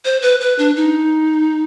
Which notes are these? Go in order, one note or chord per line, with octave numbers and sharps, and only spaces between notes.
C5
B4
B4
D4
D#4